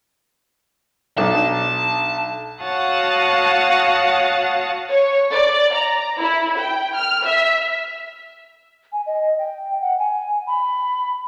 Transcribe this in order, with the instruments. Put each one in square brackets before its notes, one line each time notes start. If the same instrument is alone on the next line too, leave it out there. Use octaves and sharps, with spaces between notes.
[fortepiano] B1 D4 D#4 [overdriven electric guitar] A5
[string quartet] F#4 C#5 F5 F#5 A5 D#6
[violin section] C#5
D5
A#5
E4
G5
F6
E5
[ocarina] G#5
D#5
G5
F#5
G#5
B5